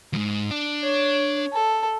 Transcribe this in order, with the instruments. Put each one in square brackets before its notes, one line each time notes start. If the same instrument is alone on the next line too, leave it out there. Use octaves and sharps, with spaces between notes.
[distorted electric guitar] E2 G#2
D4
[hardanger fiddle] C#5
A4